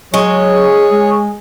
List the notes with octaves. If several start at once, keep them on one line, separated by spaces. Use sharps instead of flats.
F#3 G#3 G#4 C#5
G#3